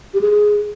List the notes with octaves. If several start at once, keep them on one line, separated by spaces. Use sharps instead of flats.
G4
G#4